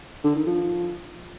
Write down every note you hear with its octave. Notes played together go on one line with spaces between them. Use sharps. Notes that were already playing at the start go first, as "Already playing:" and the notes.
D3
D#3
F3